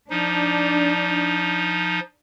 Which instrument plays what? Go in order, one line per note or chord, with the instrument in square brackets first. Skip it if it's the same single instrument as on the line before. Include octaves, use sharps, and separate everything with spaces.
[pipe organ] F3 D#4 [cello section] D4